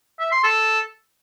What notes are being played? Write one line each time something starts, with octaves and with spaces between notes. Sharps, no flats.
E5
C6
A4